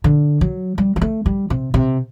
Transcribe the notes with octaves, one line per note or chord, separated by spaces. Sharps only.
D3
F#3
G3
G3
A3
G3
C3
C3